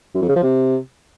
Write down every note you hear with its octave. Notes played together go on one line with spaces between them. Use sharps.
F#2
F2
C#3
F3
C3